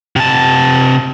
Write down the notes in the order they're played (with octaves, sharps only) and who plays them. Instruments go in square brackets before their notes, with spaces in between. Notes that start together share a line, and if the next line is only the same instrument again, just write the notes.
[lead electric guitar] C3 A5